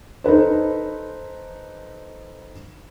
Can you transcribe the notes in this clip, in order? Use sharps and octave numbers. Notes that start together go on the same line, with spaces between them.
D#4 A4 B4 C5